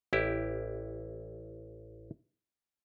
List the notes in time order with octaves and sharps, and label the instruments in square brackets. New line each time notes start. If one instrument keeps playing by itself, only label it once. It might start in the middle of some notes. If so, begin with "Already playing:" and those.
[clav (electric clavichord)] A1 E4 G4